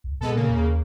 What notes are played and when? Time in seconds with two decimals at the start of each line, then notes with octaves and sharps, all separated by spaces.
0.04 C#2
0.21 A#2 G#3 B3 A4
0.35 C#3 A#3
0.49 D#2